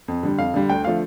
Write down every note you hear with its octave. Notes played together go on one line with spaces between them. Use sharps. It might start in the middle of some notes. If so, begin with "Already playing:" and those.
F2
D3 G3
F2 F5
D3 G3
D2 G5
D3 F3 A3 F5